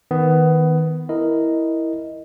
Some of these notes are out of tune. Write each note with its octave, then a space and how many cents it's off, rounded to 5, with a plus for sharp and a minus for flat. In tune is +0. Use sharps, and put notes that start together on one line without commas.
D#3 +25 B3 +15
E4 -5 A#4 +0 D#5 +0